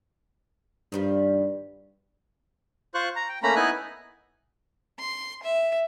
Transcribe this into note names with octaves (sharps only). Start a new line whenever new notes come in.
G2 D#3 F3 G3
F4 C5 C#6 F#6
A#5
G5
A3 A#3 C#4 A#5 B5
B3 D#4 E4 G#5 F#6
C6
E5